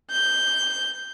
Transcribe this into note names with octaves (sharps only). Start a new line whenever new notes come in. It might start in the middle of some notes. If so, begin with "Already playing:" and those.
G6